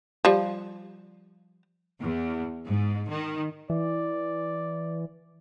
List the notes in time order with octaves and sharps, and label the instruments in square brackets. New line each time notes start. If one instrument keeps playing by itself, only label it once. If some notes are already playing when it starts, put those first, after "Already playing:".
[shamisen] F3 G3
[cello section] E2
G#2
D#3
[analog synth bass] E3 [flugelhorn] D5